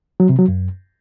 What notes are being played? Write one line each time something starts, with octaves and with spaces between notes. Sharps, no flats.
F#3
C3
F#3
F#2